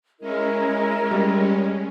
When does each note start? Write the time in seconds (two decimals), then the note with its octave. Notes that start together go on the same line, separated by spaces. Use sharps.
0.20 G#3 C#4 E4 A#4 D#5
1.11 G3